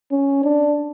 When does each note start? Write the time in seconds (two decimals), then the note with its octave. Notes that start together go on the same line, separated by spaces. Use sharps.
0.11 C#4
0.44 D4